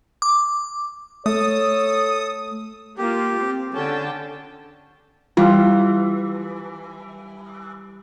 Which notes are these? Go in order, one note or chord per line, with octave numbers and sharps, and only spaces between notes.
D6
A3 A4 C#5 D#6
A#3 F4 G4
C4
D3 C#4 G5 A5
E3 G3 F4